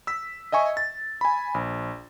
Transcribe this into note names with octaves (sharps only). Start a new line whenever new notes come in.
E6 B6
D#5 E5 G#5 C#6
A6
G#5 B5
A#1